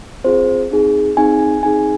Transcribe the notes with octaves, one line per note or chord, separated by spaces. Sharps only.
C4 F4 G#4 C5
C4 D#4 G#4
C4 D#4 G#4 G#5
G#5
C4 D#4 G#4 G#5